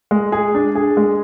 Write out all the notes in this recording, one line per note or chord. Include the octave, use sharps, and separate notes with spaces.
G#3
G#4
D4
G#4
G#3